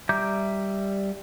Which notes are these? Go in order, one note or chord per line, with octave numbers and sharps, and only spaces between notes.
G3 E5 A#5 D6 G6